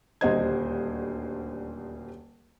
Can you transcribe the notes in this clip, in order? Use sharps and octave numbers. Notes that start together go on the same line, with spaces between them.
D#1 D2 G3 C5 D#5 G#6